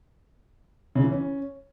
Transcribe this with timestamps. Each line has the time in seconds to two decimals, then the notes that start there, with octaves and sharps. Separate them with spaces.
0.95 C#3
1.03 E3
1.11 C#4